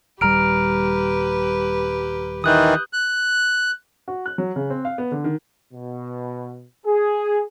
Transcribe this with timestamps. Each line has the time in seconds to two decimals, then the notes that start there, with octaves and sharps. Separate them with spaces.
0.21 D#1 G3 G4 B4 A#5 F6 D7
2.44 D#3 E3 D#6 F#6 G6
2.93 F#6
4.08 F#4
4.26 F#6
4.38 F#3
4.56 C#3
4.70 C4
4.85 F5
4.98 B3
5.11 D3
5.24 D#3
5.74 B2
6.86 G#4